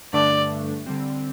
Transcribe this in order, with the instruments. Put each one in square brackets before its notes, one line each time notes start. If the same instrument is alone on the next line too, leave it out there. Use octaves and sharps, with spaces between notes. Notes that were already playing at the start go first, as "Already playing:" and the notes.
[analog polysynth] G2 D3 A3 D4 [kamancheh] D5
[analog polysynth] D3 G3 C4